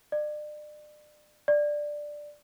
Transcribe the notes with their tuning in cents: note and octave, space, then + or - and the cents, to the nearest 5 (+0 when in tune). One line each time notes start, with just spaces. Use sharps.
D5 +35
D5 +5